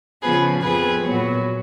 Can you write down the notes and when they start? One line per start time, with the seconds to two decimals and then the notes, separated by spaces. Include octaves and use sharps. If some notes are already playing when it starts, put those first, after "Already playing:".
0.22 C#3 F3 B3 G#4 B4
0.61 F2 F3 B3 G#4 B4
1.02 A#2 F#3 B3